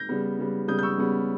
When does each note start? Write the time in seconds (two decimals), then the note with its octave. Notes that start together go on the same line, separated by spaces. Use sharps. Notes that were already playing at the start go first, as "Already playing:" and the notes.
Already playing: G6 A#6
0.09 C#3 G3 B3
0.39 C#3 G3 B3
0.68 C#3 G3 B3 D#6 G6
0.79 G6
0.83 C#6 E6
0.98 C#3 G3 B3